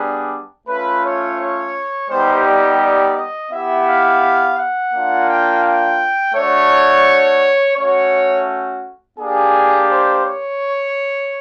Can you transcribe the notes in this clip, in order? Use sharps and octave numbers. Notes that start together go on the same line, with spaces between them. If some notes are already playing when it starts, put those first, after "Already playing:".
Already playing: G3 B3 D4 G#4
A3 C#4 F4 B4
C#5
C#5
G3 B3 D#4 G4 C5
D5
D5
D#5
B3 E4 G4 E5
F5
F#5
A#3 D4 F4
G5
G5
A3 D4 F#4 C#5
A3 C#4 F#4 C#5
A#3 D4 G4 G#4
C5
C#5